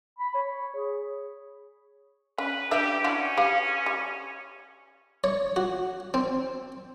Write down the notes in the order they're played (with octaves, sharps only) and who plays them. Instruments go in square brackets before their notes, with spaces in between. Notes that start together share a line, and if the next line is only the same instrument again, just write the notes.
[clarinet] B5
C#5
G#4
[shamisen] C#4 [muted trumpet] B4
[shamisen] D4 B4 E5 [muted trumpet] G4
[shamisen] E3 D4 F#4 [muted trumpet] C#4
[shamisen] G4 B4 F5
G3
[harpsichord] C#5
F#4
C4